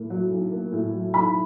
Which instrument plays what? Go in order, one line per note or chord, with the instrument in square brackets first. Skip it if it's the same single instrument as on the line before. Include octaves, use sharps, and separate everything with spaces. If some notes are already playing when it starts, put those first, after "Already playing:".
Already playing: [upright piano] A2 A#3
F#3
B1
A#3
A2
F#3
B1 B5